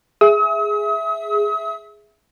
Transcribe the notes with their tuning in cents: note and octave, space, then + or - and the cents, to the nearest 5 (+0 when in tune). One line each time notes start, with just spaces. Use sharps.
G#4 +0 E5 +0 D#6 +45